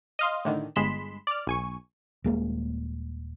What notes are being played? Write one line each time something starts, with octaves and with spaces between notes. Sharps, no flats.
D#5 F5 C6
A2 D3 D#3
G1 G#3 B5 C6 B6 E7
D5 F6
B1 G#5 C#6
D#1 G#3 A#3